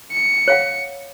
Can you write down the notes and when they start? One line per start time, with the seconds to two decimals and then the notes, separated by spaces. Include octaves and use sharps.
0.12 C#7
0.48 C#5 F5 F#5